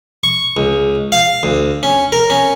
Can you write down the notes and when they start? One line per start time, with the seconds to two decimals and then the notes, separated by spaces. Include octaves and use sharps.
0.24 C#6
0.57 C#2
1.12 F5
1.43 D2
1.83 C#4
2.12 A#4
2.30 C#4